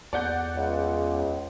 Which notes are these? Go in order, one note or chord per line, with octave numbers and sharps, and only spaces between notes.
E2 D5 F#5 G6
C#2